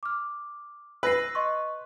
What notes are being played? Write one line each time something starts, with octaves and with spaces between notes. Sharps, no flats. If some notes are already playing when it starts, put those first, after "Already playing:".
D6 F6
B4 E6 A#6 C7
D#5 C6 C#6